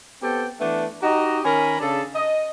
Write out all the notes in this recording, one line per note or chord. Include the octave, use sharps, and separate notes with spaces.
B3 C4 G4 A4 G5
E3 A3 B3 D4
D#4 F#4 G4 D#5 A#5
D#3 C#4 A#4 G#5 B5
C#3 D4 G#4 A4
D#5